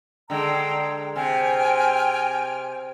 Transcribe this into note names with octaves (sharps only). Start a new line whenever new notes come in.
D3 G#3 G5 A#5 E6
C3 G5 G#5 F6